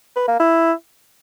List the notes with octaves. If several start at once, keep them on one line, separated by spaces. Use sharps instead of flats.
B4
A#3
E4